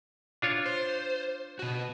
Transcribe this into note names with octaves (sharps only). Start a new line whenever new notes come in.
D4 F4 C#5
C5
B2 F#4